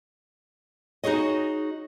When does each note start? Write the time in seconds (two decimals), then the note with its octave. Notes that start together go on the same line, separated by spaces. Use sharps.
1.04 D#4 F#4 G#4 C#5 D#5